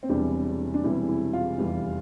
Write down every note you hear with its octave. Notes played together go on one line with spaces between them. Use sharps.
C4
E1 E2 C3 E3 G3 D4
D4
E1 E2 C3 E3 G3 E4
E4
F4
F1 E2 E3 G3